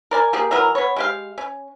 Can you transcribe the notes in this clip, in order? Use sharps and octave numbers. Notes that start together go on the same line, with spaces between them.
A#4 D5 G#5
A#3 G4 G#4
E3 F#3 B3 A#4
B3 C#5
G#3 G4 F5
C#4